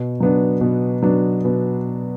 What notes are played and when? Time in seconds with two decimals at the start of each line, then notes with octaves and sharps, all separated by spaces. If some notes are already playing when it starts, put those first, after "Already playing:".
Already playing: B2
0.20 F#3 B3 D4
0.61 B2
1.02 F#3 B3 D4
1.45 B2